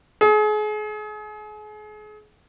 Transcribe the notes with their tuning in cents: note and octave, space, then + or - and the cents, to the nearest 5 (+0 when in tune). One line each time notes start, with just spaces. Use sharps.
G#4 +35